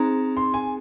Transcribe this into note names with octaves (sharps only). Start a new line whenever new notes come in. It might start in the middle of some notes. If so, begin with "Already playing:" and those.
Already playing: C4 D#4 G#4 A#5
C6
G#5